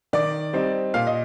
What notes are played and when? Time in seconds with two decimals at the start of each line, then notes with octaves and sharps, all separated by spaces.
0.13 D#3 D5
0.53 G3 C4 D#4
0.94 A#2 F5
1.07 D#5